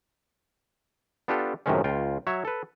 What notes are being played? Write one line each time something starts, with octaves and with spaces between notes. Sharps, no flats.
B3 D4 F4 G4 A4
F#2 A2 C3 D#3 G#3 C#4
C#2 F4 G5
F#3 C#5 E5
A4 B4